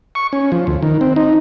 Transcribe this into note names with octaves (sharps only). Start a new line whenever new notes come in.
C#6
C#4
F3
D2
D#3
C4
D#4